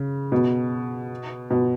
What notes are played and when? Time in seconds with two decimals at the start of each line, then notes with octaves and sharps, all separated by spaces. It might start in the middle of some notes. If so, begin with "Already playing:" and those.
Already playing: C#3
0.32 B2
1.51 B2